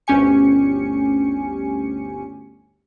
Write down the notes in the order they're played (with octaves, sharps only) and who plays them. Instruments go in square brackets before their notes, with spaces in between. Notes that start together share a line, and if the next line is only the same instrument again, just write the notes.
[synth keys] G1 D2 C#4 G4 G#5 C#7